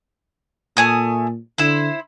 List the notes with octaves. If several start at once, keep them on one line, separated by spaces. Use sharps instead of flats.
A#2 A3 G#5 D#6
D3 E4 C5